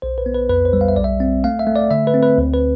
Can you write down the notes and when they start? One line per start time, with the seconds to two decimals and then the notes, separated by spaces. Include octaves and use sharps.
0.02 B1 C5
0.18 B4
0.26 B3
0.34 B4
0.49 F2 B4
0.65 C5
0.73 G3
0.81 F5
0.88 E5
0.96 B1 D5
1.04 E5
1.20 C4
1.44 A3 F5
1.59 E5
1.67 A3
1.76 D5
1.91 D3 E5
2.07 B4
2.14 C4
2.23 B4
2.38 D2
2.54 B4